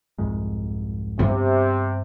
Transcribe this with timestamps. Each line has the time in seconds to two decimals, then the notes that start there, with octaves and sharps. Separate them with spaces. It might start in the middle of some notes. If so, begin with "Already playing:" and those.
0.18 C2 F2 G#2
1.19 G2 C3 B3